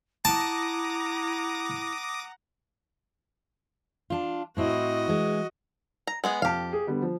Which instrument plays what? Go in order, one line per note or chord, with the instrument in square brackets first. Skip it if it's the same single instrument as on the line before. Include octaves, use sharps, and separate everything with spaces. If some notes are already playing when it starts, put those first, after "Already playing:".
[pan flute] E4 [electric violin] F#5 A#5 [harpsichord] A5 [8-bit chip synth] D6 D#6 A#6
[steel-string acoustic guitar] D4 F4
[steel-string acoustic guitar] A2 C4 E4 [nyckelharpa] F#4 D#5
[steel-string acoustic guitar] E3 G#3
[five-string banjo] A#5
G#3 B3 G#4
[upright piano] F2 A5 [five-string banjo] G4 F5
[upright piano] G#4
D3 G3 B3
F3